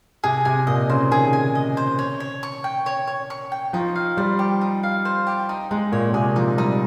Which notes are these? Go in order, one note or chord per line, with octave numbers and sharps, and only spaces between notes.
C3 G#4
C3 G#5
A#2 D#5
C#3 C5
D#3 G#4
G#5
D#5
C5
C#5
C#5
C#6
G5
C#5
C#5
C#6
G5
F3 D#4
F5
G3 C5
G4
D#4
F5
C5
G4
D#4
G#3 D#4
A#2 C#5
A#2
C3 G#4
F3 D#4
G3 D#4